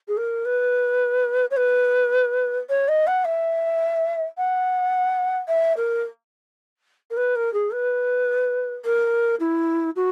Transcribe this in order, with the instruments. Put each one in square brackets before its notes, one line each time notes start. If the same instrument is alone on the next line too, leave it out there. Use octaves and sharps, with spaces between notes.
[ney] G#4
A#4
B4
C#5
B4
C#5
D#5
F#5
E5
F#5
E5
A#4
A#4
B4
A#4
G#4
B4
A#4
E4
F#4